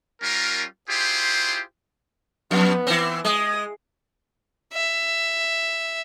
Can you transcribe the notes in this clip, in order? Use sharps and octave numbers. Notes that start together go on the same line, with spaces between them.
G3 C#4 F4 A#4
E4 F4 G4 G#4 C5
F2 B3
E3 C4
G#3 D#6
E5